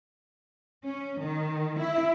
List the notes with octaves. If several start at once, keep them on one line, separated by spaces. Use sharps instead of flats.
C#4
D#3
E4